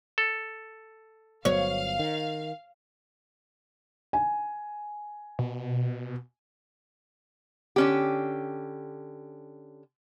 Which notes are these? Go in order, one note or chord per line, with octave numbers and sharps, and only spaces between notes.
A4
G1 F#3 B3 C#5 F5
D#3
G#5
B2
D3 C#4 G4